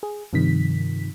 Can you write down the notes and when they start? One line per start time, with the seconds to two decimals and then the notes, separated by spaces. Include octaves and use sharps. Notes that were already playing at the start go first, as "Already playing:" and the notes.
0.03 G#4
0.33 G2 C3 D#3 F3 B6